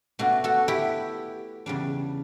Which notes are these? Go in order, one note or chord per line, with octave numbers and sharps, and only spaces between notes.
B2 A3 D4 F#4
F#4 A4
E4 G4
E2 C#3 G3 D4